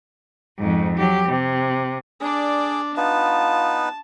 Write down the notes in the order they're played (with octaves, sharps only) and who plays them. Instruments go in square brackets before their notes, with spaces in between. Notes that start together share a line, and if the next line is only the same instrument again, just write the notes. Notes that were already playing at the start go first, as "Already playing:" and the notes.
[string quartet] F2 G#2
F#3 G4
C3
[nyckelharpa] D4 D5 [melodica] G#4
[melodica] B3 D#4 B4 [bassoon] F4 [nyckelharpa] A5